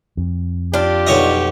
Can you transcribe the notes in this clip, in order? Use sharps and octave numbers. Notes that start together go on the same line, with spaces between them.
F2
D4 F4 G4
B1 C#5 D#5